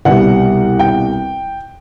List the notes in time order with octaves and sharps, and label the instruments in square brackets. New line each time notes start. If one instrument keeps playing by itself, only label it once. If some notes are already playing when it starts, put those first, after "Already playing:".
[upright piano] C2 B2 G3 F#5
G5